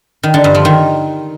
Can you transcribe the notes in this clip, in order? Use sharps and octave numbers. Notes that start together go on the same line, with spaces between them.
D#3
D3
G2
F3
D#3